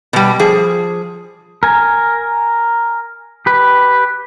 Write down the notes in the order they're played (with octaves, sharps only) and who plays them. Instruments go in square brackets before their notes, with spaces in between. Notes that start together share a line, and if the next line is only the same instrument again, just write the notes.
[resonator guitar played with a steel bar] B2 G3
F3 G#4
[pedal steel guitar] A#4 G#5
G4 B4